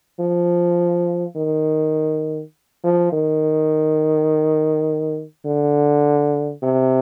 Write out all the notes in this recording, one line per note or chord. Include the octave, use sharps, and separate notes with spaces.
F3
D#3
F3
D#3
D3
C3